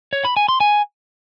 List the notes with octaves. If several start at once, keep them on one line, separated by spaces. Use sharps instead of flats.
C#5
B5
G#5
C6
G#5